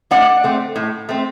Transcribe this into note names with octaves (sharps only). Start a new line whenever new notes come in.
A2 D5 F#5
A3 C4
A2
A3 C4